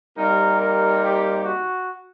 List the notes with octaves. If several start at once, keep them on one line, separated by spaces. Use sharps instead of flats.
C3 G3 A#3 D#4 A#4
A#4
G4
F#4